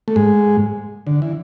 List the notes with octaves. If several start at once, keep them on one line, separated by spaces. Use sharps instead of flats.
A3
G#2 G#3
D3
E3